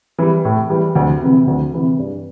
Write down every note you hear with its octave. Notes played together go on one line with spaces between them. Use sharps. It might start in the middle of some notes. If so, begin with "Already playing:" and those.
E3 G3
A2
E3 G3
D2
C3 E3
D2
C3 E3
G2